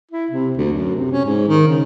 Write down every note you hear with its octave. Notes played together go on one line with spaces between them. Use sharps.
E4
C3
D2
F#2
C3
C#4
G#2
D#3
C#3